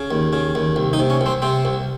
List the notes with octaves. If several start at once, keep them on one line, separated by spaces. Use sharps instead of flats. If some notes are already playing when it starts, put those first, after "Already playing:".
Already playing: C#3
D#2
C#3
D#2
C2
D#4
C3
C#4
C2 C4
C3 C4
C2